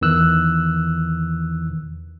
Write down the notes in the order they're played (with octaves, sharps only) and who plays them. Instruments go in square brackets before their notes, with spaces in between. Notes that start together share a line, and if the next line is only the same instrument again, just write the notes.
[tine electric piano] E2 D#3 E3 E6 F#6